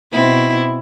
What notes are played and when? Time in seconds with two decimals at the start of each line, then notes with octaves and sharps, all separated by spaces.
0.12 B2 C4 E4